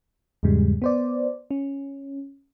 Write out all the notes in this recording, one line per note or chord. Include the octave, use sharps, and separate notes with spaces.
E2 G#2 C#3 G3 G#3
B3 C5 D5
C#4